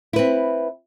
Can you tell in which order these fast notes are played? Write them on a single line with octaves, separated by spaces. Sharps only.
E4 B4 C4